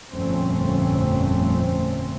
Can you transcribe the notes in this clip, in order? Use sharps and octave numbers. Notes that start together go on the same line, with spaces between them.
G1 F2 A#2 A3 C4 C#4